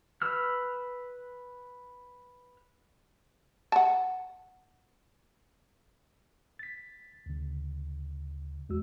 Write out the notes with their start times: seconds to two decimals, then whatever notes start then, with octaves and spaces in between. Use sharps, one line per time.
0.22 B4 E6 F6
3.72 F#5 A5
6.59 A6 B6
7.26 D2 C#3
8.69 E2 G#3 F#4 E6